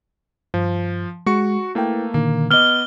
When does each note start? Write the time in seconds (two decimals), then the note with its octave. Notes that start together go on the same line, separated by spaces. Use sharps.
0.54 G2 F3
1.26 G#3 F#4 C#6 C#7
1.75 A3 A#3 E4 B4 G5
2.14 A#2 D3 D#3 A#3
2.51 B3 D#5 D6 F6 G7